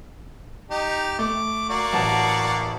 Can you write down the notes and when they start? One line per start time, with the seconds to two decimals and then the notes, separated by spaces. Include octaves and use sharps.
0.71 D#4 G4
1.19 A3 D6
1.70 A#3 F#4 D5
1.93 A1 F#5 A5